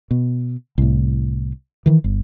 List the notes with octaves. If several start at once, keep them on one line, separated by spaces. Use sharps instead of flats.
B2
C2 A2
D#3 E3
G1